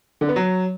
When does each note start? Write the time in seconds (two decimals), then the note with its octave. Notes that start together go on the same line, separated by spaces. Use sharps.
0.21 D3
0.29 B3
0.36 F#3